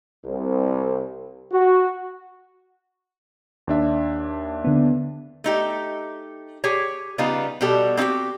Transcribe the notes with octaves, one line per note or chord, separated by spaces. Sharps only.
C2
F#4
D#2 D4 E5
D3 B3
A3 D#4 G4
G4 G#4 C#5
C#3 G3 B3 D#4 F4 G4
B2 G3 F#4 G4 A4
C4 D#4 E4 F#4 G4